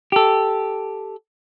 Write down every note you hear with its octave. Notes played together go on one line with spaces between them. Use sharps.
G4 A4